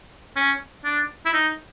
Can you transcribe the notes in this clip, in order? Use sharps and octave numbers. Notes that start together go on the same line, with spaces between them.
C#4
D4
E4
D#4